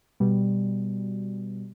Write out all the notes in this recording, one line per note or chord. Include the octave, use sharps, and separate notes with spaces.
B2 G3